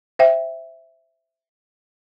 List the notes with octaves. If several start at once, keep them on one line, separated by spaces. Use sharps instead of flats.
C5 E5 G5